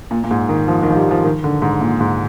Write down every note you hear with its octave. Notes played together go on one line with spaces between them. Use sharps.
A#2
A#2
G#2
D#3
F3
D#3
F3
G3
F3
D#3
D3
G#2
A#2
G#2